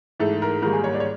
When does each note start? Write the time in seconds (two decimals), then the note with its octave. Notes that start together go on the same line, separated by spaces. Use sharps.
0.20 G#2 E3 A3 A4
0.42 A#4
0.62 G#2 D#3 G3 A#3 A#4
0.73 G#4
0.84 C#5
0.94 D5
1.00 C#5